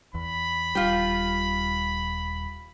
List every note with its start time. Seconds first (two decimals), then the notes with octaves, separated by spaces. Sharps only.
0.15 E2 B5
0.75 D#1 G3 F4 G4